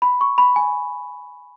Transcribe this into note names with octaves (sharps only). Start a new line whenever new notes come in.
B5
C#6
B5
G#5